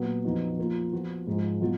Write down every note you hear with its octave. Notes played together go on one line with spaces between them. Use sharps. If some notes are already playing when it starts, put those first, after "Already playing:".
Already playing: A#2 F#3 B3 F#4
F2 F3 B3 D#4 F#4
F3 A#3 F4
F3 B3 F#4
G#2 F3 G#3
B2 F#3 A#3 F4